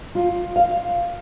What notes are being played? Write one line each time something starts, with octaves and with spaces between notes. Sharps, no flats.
F4
F5